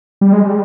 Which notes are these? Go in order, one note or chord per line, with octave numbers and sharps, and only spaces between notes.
G3
G#3
G3